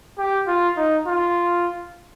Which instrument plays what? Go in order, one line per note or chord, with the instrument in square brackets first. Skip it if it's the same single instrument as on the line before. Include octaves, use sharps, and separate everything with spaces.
[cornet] G4
F4
D#4
F4